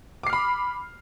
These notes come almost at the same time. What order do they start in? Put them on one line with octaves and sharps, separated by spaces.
D6 C7 F6 B5